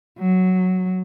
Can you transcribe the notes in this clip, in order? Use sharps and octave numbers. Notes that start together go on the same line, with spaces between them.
F#3